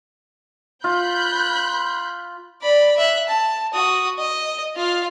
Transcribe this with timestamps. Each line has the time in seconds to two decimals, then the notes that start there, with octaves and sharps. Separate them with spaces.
0.84 F4 B5 F#6 G6
2.62 D5 B5
2.97 E5 F#6
3.28 A5
3.73 F#4 D#6
4.18 D#5
4.76 F4 F5